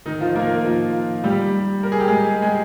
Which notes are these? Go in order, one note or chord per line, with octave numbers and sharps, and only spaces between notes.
D#3 D#4
F3 F4
A#3 A#4
F3 F4
G3 G4
A#4
G#4
G4
G#3 G#4
G#3 G#4